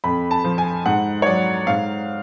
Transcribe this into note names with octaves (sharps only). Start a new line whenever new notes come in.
F2 B5
A5
F3
G#5
G#2 F#5
C#5
F#3 D5
G#2 F5